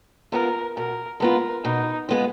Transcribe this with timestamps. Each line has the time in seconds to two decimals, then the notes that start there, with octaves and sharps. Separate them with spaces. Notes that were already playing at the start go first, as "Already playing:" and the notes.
0.32 G#3 B3 F4 A#4
0.76 B2 A#4
1.20 G#3 B3 F4 A#4
1.64 B2 D#4
2.09 G#3 B3 F4